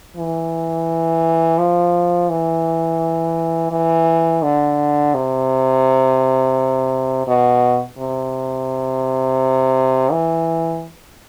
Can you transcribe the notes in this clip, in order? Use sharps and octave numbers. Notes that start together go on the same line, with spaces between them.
E3
F3
E3
E3
D3
C3
B2
C3
E3